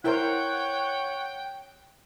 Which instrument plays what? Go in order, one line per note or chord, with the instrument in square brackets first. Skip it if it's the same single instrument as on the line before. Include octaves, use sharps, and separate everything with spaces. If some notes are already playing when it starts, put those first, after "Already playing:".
[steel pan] E4 A#4 C5 [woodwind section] C#5 F#5 [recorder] G5